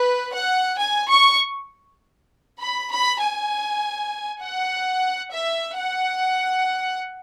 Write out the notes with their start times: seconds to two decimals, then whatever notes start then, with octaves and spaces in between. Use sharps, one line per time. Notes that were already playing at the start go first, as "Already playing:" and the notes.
Already playing: B4
0.33 F#5
0.78 G#5
1.09 C#6
2.58 B5
2.89 B5
3.19 G#5
4.40 F#5
5.30 E5
5.75 F#5